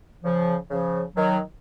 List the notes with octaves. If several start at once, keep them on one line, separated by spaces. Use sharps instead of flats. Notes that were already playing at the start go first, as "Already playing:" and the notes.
C#3 F3
C#3 F3
D#3 F#3